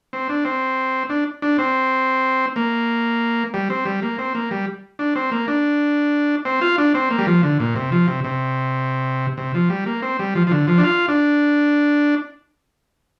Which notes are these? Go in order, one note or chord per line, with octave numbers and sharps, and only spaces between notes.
C4
D4
C4
D4
D4
C4
A#3
G3
C4
G3
A#3
C4
A#3
G3
D4
C4
A#3
D4
C4
F4
D4
C4
A#3
G3
F3
D3
A#2
C3
F3
C3
C3
C3
F3
G3
A#3
C4
G3
F3
F3
D3
F3
D4
F4
D4